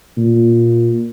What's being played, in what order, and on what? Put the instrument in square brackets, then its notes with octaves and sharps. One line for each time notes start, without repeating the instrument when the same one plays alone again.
[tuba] A#2